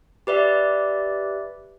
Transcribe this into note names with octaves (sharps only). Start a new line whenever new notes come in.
G4 B4 D5 E5